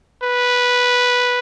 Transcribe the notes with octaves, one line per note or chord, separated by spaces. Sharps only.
B4